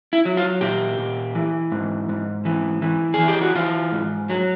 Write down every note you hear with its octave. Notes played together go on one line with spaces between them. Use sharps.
E4
F#3
F4
A#2 G4
A#2
E3
G#2
G#2
E3
E3
G#4
E3
G4
F#4
E3 F4
G#2
F#3